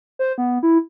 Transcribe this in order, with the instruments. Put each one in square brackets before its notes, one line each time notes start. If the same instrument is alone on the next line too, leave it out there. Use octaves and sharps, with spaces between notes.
[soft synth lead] C5
B3
E4